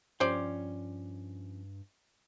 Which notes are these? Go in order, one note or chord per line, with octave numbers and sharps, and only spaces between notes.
G2 F3 C#4 G4 C5 D5